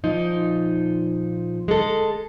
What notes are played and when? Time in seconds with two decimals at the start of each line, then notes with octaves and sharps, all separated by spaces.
0.04 A#2 F3 D#4
1.68 G#3 A4